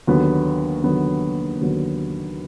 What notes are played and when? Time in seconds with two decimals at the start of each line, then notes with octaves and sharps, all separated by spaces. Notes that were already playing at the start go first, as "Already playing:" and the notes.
0.07 D#2 D3 F#3 B3
0.84 D#2 D3 F#3 B3
1.60 D#2 D3 F#3 B3